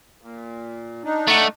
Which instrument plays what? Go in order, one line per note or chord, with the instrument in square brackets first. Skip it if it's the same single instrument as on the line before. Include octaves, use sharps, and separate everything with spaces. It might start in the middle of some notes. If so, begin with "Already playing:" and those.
[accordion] A#2
D4 D#4
[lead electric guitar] A3 [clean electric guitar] D5 F#5